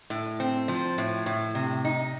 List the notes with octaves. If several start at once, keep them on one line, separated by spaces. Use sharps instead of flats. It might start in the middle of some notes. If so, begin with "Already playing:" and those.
A2
C4
F3
A2
A2
C3
D#4